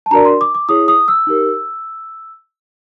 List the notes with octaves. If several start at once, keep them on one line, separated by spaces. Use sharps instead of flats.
A5
D4 F#4 A#4 D5 A#5
C6
D6
D6
E4 G#4 C#5 D#6
D#6
E6
D#4 G4 A#4